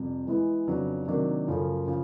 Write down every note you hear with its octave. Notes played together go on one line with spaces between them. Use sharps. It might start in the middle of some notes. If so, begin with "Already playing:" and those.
Already playing: F2 C3 G3
E3 G#3 B3 E4
F2 C#3 F#3 B3 D4
C3 D#3 F#3 A#3 D4
F#2 C#3 F3 A3 C#4
C#3 F3